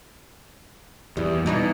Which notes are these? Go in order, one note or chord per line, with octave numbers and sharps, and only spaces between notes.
E2 G3
B2 E3 D#4 B4